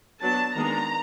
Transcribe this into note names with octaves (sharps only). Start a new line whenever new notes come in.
F#3 B3 D4 A5
D#3 G#3 B3 D4 A#5